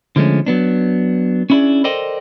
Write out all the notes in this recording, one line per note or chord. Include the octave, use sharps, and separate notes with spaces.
D3 F3 G#3 A3 C#4
F#3 B3 D4
C#4 D4 E4 G#4 D5
A4 A#4 C5 D5 D#5 G5